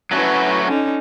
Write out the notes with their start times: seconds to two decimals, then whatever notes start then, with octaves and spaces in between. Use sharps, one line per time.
0.11 F#3 A3 C#4 E4 F#4 B4
0.67 D3 C#4 D#4